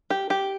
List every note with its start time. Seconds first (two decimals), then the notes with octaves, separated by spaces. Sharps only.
0.10 G4
0.30 G4